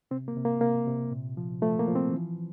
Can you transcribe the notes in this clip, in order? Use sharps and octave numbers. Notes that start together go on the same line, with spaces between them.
C3 C4
A#3
C3
A#3
C3 A#3
C3
A#2
F3
F3 A3
A#3
F3
C4
E3